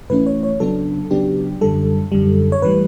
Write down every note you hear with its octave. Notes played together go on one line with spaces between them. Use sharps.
A2 E3 A3 C#4 E4 B4
C#5
C#5
C#3 F#3 B3 D4 A4
C#3 F#3 B3 D4 G4
F#2 D3 G3 A4
F#2 D3 G3
C#5
A2 E3 G3 B4